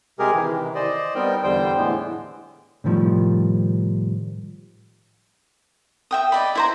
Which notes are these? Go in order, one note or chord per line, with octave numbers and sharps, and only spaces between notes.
C3 G#3 G4 G#4 A#4
C3 D#3 E3
C5 D5 D#5
G3 B3 C4 D#4 A#4 G5
E2 D3 G3 C5 G5
A2 D3 E3 G#3 B3
A2 C3 D#3 F3 G3
E5 G5 D#6
D5 D#5 B5
E4 C5 A#5